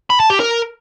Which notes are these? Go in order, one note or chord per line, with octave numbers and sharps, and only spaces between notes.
B5
A5
G4
A#4